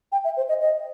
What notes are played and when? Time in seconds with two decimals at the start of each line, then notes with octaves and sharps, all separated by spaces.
0.12 G5
0.24 E5
0.37 C5
0.49 D#5
0.61 D#5